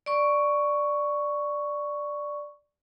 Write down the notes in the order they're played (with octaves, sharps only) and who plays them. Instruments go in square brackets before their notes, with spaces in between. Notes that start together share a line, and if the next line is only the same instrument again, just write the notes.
[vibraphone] D5 C#6